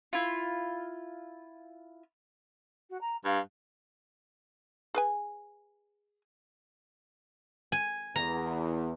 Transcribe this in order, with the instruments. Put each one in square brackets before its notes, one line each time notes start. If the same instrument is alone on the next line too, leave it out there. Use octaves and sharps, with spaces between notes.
[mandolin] E4 F4
[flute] F#4
A#5
[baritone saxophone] G2 [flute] F5
[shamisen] G#4 B4 G#5
[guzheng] G#5
[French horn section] E2 [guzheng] A#5